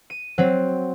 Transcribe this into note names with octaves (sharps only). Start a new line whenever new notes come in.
D#7
F#3 C4